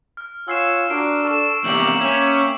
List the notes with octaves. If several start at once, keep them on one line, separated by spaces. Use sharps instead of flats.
F6
F4 C#5 F#5 G#5 E6 C7 E7
D4 F#4 A#4 C7 D7
A4 C#6 E7
E2 C3 A#3 G4 C#6 D6 G6 F#7
C#4 E5 G5 C#6